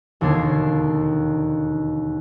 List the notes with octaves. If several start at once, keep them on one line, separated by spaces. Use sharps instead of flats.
E1 D#2 D3 D4 G#6 C7